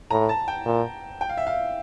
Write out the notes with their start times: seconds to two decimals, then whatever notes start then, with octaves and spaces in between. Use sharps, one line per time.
0.11 A2 A#5
0.29 A5
0.48 G5
0.65 A#2
1.21 G5
1.29 F5
1.37 E5
1.47 F5